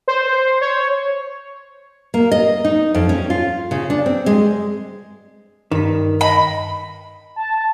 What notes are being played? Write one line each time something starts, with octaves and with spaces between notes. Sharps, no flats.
C5
C#5
A#3
D#5
D#4
F2
C#4
F4
C#3
D4
C4
G#3
G2 D#3 B6
D#5 B5
A5